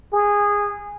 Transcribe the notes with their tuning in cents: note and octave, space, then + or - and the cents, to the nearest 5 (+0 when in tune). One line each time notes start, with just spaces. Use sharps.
G#4 -15